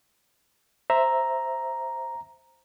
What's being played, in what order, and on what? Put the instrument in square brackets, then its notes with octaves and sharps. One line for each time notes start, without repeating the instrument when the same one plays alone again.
[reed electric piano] C5 E5 [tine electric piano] A#5